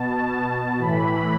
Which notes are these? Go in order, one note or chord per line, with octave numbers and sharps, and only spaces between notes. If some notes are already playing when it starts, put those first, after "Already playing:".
Already playing: B2 A5
A2 E3 B5